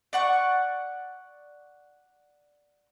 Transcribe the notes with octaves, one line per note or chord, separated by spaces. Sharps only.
D5 F#5 C#6